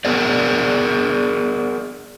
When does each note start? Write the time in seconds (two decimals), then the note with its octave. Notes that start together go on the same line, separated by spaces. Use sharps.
0.05 B3 G#4 A#4 D5